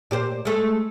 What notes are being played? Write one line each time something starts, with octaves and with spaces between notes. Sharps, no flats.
A#2 G4 C5
G#3 A3